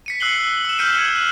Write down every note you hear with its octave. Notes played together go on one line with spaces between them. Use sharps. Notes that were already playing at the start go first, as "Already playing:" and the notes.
B6 C#7 D#7
E6 F#6 C7 F#7 G7
E6 E7
F6 G6 B6 C#7 D#7 F#7
G#6
F#6